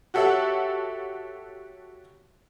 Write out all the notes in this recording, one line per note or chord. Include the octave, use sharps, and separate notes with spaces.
F#4 G4 A4 C#5 E5 F#5